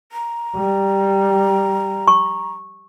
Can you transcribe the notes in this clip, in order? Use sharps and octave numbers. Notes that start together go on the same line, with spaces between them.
A#5
G3
C#6